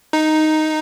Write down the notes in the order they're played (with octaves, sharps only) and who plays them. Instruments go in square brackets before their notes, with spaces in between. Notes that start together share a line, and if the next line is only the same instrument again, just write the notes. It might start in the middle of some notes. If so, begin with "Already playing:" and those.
[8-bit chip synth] D#4